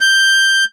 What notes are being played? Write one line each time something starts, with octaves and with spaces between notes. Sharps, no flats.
G6